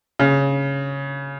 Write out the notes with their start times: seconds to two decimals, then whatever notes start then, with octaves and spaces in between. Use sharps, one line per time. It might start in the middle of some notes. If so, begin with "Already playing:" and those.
0.19 C#3